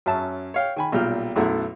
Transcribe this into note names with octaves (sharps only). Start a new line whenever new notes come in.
F#2 C#4 E5 A5
C#5 F5 G5
D#3 G#5 B5
B1 A#2 G3 G5 F6
B1 F#2 A3 E4 E5 F#5